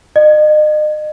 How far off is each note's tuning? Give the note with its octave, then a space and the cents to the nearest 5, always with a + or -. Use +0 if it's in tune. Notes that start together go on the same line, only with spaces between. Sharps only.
D#5 -40